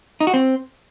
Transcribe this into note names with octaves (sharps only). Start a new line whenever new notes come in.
D#4
F#4
C4